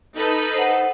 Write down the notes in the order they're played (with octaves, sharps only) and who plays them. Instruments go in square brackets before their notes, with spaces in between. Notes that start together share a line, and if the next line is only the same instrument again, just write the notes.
[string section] D#4 A4 B4
[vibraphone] C5 F#5